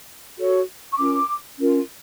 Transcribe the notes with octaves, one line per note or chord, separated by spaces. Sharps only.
F#4 A4 C#5
C#6
C#4 F4 A#4 D6
C#4 F4 A#4